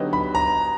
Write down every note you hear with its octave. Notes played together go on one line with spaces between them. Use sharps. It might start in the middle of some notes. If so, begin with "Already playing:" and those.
Already playing: D3 F#3 B3 D#4 G4
B5
A#5